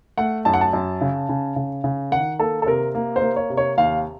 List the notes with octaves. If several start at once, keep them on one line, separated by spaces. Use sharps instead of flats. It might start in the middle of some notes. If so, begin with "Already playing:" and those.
A3 F#5
F#2 A5
F#5
A5
F#2
C#3
C#3
C#3
C#3
D#3 F#5
A#3 A4
A4
C3 A#4
A#3
C5
A#3
C#5
C3
C#5
D#2 F5